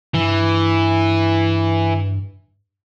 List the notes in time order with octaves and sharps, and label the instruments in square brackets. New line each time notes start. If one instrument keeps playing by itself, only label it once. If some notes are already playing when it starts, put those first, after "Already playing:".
[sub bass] G2 [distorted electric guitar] E3